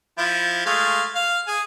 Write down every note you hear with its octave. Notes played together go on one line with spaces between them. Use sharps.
F3 E4 F4
G#3 A3 F5
F5
G#4